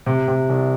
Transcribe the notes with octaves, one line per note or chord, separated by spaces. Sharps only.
C3
C3
C2